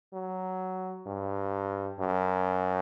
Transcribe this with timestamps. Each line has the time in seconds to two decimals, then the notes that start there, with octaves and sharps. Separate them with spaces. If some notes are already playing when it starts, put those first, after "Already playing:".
0.13 F#3
1.06 G2
1.99 F#2